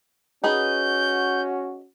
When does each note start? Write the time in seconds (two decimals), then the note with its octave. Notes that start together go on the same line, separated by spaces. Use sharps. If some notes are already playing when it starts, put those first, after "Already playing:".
0.44 C#4 D#4 F#4 G#4 B4 G6